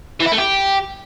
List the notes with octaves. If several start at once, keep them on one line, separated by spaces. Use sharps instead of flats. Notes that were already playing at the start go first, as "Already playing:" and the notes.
E3
E4
A3
G4